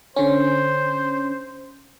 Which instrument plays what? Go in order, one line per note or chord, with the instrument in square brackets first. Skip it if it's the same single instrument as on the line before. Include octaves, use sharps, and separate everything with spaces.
[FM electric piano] D3 C#4 [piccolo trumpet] C5